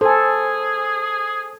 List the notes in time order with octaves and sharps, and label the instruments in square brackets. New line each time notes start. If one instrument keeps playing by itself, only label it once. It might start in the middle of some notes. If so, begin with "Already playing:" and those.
[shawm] G#4 [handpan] A4 [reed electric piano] C5 G#5